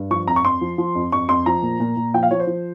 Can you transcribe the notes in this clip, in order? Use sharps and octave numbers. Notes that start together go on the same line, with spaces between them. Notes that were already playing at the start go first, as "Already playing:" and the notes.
Already playing: G2
F3 C#6
F2 A#5
C#6
F2 C6
F3
F3
F2
F2 C#6
F2 C6
F3 A#5
A#2
A#2
A#2
F3 G5
F5
F3 C#5
C5
F3